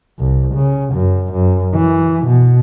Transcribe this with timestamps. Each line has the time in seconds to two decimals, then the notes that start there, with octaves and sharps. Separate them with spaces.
0.20 C2
0.55 C#3
0.94 F#2
1.33 F#2
1.75 E3
2.27 B2